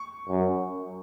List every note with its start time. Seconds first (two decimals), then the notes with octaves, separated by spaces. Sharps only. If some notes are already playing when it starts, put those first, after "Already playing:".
Already playing: C#6
0.29 F#2